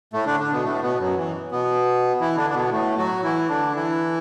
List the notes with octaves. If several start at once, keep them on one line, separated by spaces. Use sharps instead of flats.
A2 A3
D3 D4
D3 D4
B2 B3
A2 A3
B2 B3
F#2 F#3
E3
B2 B3
E3 E4
D3 D4
D4
B2 B3
A2 A3
F#3 F#4
E3 E4
D3 D4
E3 E4